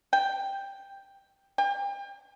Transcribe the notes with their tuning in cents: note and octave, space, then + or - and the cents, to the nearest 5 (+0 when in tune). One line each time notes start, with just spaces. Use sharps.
G5 +5
G5 +35